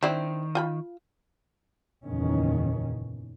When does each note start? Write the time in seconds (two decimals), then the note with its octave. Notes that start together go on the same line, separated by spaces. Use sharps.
0.03 D#3 C4 D4 E4
0.55 F4 G5 B5
2.05 F#1 E2 A#2 D#3 C#4